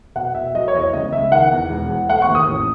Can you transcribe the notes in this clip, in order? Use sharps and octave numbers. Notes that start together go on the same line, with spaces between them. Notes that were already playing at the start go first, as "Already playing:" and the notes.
B2 F#5
B2 E5
F#3 D#5
C#5
E2 D#5
C#5
C#2 D#5
C#2 E5
D#3 F#5
E2
E1
E2
A3 F#5
C#6
D#2
D#6
A1